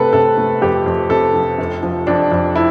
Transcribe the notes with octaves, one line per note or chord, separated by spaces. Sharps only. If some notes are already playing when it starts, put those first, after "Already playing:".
Already playing: C3 A3 A4 B4
C3 A4
A3
F2 G4
F2
C3 A4
F3
F1
F3
F2 D4
F2
E4